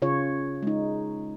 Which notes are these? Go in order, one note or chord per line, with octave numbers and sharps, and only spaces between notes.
C#3 F4 C#5
G#3 D#4